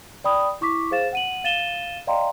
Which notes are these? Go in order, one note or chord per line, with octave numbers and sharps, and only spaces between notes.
D5 G5 B5 D#6
E4 C#6 D6 B6
G#4 C5 F5 A6 E7
F#5 D#7 F#7
F5 A6 D#7 E7 G7
D5 D#5 F5 G5 A#5 C6